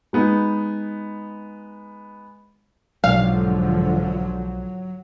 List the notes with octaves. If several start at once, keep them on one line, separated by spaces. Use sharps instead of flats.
G#3 B3 D#4
B1 G#2 D3 F3 F#3 F5